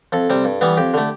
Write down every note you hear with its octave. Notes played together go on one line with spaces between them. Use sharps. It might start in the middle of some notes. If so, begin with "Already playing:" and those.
F2 A4
C3 G3 C4
G2
E3 G3 B3
F2 G4
D3 A3